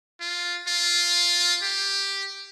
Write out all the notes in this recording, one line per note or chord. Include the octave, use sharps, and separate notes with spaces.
F4
F4
G4